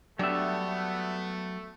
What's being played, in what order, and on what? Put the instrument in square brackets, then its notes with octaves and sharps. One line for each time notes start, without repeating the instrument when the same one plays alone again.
[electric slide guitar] F#3 E5 [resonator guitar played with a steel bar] G3 D4 [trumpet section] A3 [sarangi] B3